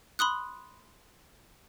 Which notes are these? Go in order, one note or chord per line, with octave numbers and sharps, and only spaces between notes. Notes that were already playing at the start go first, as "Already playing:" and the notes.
B5 C6 D#6 F#6